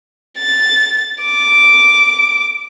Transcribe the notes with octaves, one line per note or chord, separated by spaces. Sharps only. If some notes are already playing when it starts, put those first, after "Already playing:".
A6
D6